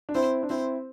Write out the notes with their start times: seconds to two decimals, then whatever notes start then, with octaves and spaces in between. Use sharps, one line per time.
0.09 D4
0.15 C4 E4 C5
0.43 D4
0.50 C4 E4 C5